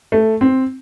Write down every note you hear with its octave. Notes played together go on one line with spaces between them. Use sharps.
A3
C4